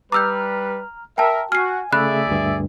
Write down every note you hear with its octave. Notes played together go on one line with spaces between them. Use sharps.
G3 B4 A#5 D6 E6 F6 G6
A#4 E5 G5 A5
F#4 G#5 F6 C7
C#3 A3 G#4 D5 E5 B5 F#6
D2 G2